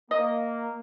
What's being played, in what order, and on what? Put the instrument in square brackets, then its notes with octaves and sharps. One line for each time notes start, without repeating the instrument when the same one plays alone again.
[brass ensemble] A#3 [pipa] D#5